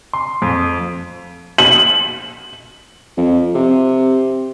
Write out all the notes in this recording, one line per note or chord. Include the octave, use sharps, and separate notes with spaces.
C6
F2
F#7
F2
C3